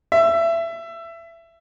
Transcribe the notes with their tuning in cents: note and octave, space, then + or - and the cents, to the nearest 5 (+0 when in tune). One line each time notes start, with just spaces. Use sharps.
E5 +20